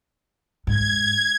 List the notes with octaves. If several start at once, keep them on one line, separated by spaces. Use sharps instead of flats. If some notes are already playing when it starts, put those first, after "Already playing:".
G#2 G#6